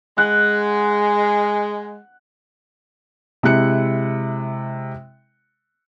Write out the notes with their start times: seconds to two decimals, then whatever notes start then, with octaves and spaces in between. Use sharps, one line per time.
0.18 G#3 F#5
3.43 C3 G#3 E4 F#6 C#7